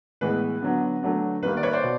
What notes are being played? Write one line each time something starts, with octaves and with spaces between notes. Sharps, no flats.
A2 E3 G#3 B3 B4
D3 F#3 B3
D3 F#3 A3
D#3 G3 A#3 B4
D5
B4 C#5
C5 D5
B2